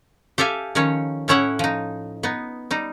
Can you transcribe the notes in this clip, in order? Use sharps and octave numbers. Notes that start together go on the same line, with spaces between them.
G4 A4 E5 F5 G#5
D#3 F3 C#4 C#5
A2 C#4 E4 C#5 E5 F#5
F3 D#4
B3 D#4
G3 D#4